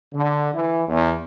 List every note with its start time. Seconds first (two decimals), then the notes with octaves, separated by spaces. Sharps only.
0.14 D3
0.53 E3
0.88 E2